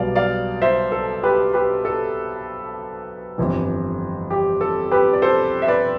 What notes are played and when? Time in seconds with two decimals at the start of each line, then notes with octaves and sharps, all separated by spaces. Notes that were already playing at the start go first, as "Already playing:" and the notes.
Already playing: B1 B2 G3 D5 F5
0.16 D5 F5
0.62 C5 E5
0.92 A4
1.23 G4 B4
1.53 G4 B4
1.85 A4
3.38 G1 F2 E3 G3
4.30 G4
4.61 A4
4.91 G4 B4
5.13 D5
5.22 A4 C5
5.62 E5
5.68 B4 D5